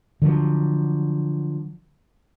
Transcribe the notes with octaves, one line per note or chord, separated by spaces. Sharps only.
D3 F3 F#3